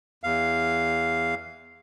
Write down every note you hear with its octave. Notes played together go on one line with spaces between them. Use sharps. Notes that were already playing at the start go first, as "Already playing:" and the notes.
E2 F5